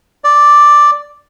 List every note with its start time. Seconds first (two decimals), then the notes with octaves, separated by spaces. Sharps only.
0.24 D5